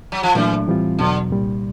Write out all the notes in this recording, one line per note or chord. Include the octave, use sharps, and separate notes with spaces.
F#3
F3
A#2 E3 F#3 A3 D4
A2 E3 G3 C4 F4
E2 B2 D3 F#3
C2 A#2 G3